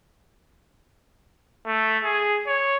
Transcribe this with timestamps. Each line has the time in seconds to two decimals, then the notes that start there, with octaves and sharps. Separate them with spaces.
1.66 A3
2.04 G#4
2.47 C#5